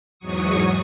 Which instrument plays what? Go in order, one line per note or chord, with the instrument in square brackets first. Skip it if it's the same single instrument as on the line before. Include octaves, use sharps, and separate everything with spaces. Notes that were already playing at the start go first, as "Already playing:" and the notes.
[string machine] E2 G#2 F#3 C#6 D#6